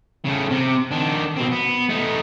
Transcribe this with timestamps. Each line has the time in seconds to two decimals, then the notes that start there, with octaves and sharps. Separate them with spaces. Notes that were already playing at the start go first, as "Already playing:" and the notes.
0.25 C#3 A3
0.51 C3
0.91 D#3 D4
1.37 B2 C4
1.52 B3
1.89 A3 D#4